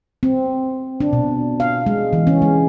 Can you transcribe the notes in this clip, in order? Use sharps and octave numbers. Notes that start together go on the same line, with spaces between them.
C4
D4
B2
F5
G#3
E3
C#4
G#3